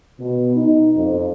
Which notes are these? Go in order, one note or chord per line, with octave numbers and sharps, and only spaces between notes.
B2
D#4
F2